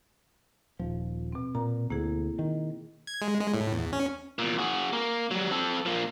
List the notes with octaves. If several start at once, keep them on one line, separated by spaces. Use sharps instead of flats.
D#1 F3
B2 C4
A#2 A#5
D2 A#3 E4 G#4
D#3
G#6
G#3
G#3
A2
E2
C#4
E2 A#2
F#4 G#4
A#3
F#3 G3
C4 A4
F3 A#3